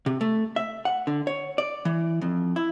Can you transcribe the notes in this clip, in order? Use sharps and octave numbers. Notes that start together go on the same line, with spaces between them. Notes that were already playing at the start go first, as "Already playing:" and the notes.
C3
A3
E5
F#5
D3
C#5
D5
E3
F2
E4